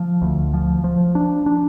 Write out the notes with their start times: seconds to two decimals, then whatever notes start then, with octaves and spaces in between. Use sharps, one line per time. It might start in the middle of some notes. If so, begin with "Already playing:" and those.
Already playing: F3
0.22 D2
0.54 F3
0.84 F3
1.15 D4
1.46 D4